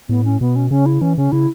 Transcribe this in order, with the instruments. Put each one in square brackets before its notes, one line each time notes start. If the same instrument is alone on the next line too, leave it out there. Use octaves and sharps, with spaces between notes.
[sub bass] A2 [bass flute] B3
[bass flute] C#4
[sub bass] B2 [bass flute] B3
[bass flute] C#4
[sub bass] C#3 [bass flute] C#4
[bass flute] E4
[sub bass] E3 [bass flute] C#4
[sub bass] C#3 [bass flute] C#4
[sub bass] C#3 [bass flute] E4